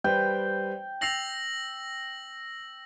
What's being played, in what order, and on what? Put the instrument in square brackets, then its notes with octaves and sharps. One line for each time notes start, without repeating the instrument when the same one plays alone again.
[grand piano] G3 B4 C5 [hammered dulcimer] G5
[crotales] E6 A#6 F#7 [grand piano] A6 C7 F7